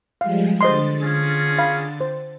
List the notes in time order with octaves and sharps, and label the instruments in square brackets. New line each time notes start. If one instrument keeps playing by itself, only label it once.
[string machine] F3 G3 G#3 [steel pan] F5
[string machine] D3 A6 [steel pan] C5 D#5 C6
[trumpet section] C#4 F4 G#4
[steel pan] F5 B5
C5